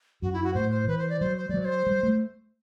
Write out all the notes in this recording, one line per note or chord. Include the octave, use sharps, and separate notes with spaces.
F#2 F#4
E4
F#4
A2 C5
C5
E3 B4
C5
D5
F#3 C5
C5
F#3 G3 D5
D5
C5
G3
A3